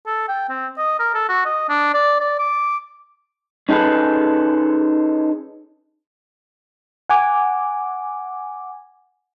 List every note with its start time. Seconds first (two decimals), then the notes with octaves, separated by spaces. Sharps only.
0.07 A4
0.28 G5
0.49 C4
0.78 D#5
0.99 A#4
1.14 A4
1.29 F#4
1.45 D#5
1.69 D4
1.94 D5
2.20 D5
2.39 D6
3.69 C#4 D#4 G#4 A4 B4
7.09 F#5 G#5 D6